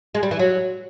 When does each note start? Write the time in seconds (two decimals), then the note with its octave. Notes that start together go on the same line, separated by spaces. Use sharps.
0.15 G#3
0.23 G3
0.31 E3
0.39 F#3